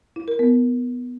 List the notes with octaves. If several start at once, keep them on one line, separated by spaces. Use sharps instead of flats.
E4
A#4
B3